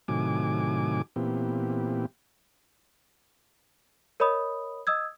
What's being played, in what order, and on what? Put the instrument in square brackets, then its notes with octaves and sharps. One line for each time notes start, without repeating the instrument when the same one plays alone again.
[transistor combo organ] A2 C3 D#3 F#3 G#5 D6
A#2 E3 B3 C4 G4
[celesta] A#4 C#5 D#5 B5 D#6
D#5 D#6 E6 G#6